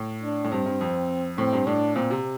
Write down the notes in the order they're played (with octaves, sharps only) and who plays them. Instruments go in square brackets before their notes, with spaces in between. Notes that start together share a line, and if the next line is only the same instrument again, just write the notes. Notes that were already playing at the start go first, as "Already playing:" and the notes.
Already playing: [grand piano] A2
[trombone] D4
[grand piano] A2
[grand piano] G2 [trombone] C4
[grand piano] G2
F2
[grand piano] A2 [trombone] C4
[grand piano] G2
[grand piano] A2 [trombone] D4
[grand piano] A#2 [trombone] C4
[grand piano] C3